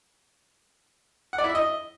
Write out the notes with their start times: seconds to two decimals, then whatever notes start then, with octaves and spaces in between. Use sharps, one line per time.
1.33 F#5
1.38 D5
1.44 E4
1.49 E5
1.55 D#5